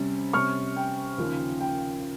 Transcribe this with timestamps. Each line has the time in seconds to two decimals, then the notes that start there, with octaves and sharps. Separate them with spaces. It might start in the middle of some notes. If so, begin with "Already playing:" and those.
Already playing: C3 G3 C#4
0.33 C3 G3 C#4 C#6 F6
0.76 G5
1.18 D#2 C#3 F3
1.60 G5